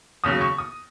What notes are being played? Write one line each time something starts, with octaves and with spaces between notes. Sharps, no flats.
D#2 C#3 F#3 D#6
C#6
D#6